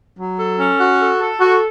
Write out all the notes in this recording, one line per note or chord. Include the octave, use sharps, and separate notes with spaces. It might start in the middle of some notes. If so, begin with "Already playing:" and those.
F#3
A4
C#4
F#4
A4
A4
F#4